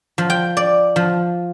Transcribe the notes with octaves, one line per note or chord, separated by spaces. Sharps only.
F3
G5
D5
F3